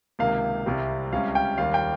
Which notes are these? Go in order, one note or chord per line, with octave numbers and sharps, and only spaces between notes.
C#2 C3 D#3 A#3 F5
C2 C3 G3 C4
C#2 C3 G3 C#4 F5
G5
D#2 D#3 G3 F5
G5